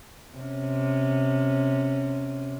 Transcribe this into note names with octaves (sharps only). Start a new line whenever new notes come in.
C3 C#4